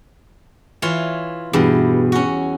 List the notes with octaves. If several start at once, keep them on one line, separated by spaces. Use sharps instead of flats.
E3 F4 C#5
E2 G2 B2
C#4 F#4